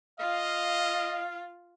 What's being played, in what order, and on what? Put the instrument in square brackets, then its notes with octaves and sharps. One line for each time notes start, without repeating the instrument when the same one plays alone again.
[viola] F4 [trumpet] D#5 [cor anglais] F5